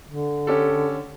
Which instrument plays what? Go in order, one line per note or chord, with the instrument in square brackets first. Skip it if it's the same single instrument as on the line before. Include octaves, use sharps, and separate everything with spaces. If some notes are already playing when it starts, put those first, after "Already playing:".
[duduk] D3
[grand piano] C#4 G4 A4